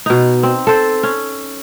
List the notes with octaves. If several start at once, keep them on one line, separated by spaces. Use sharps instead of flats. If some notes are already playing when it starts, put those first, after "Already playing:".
B2 D#4
C4
A4 C5
C#4